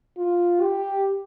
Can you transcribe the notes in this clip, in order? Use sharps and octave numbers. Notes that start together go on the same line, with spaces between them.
F4
G4